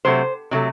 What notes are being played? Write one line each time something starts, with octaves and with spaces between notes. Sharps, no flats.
C3 F#3 A3 C5
C3 F#3 A3